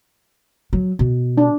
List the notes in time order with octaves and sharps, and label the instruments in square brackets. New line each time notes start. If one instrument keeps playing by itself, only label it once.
[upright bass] F#3
B2
[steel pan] D4